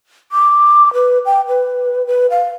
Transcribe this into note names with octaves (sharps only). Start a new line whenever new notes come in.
D6
B4
G5
B4
B4
F5